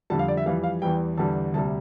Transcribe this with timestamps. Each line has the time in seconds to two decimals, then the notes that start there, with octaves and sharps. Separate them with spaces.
0.10 F2 D3 G3 A5
0.19 F5
0.28 D5
0.37 E5
0.46 F2 E3 G3 F5
0.64 F5
0.82 E2 E3 G3 G5
1.17 E2 D3 G3 A5
1.54 D2 C3 G3 A5